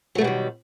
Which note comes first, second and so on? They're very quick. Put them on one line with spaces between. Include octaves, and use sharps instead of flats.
F#3 A3 B2 G3 D#3